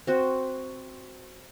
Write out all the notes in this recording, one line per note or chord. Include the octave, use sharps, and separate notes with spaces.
C4 F#4